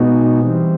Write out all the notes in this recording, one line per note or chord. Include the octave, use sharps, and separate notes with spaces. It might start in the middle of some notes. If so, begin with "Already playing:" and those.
Already playing: B2 G#3 B3 D#4 F#4
E3 G3 C4